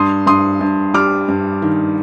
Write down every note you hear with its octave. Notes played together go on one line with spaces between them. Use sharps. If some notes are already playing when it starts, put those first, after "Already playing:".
Already playing: G2 C6 D#6
G2 C6 D#6
G2
G3 D6 F6
G2
D#3